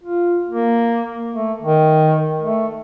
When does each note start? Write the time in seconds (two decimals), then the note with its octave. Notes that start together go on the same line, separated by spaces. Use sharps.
0.03 F4
0.49 A#3
1.34 A3
1.62 D#3
2.42 A3